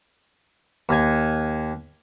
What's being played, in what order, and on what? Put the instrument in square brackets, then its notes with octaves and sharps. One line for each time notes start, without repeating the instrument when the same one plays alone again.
[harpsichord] D#2 G#5